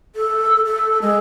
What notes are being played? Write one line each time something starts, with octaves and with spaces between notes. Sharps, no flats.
A4
A4
G#3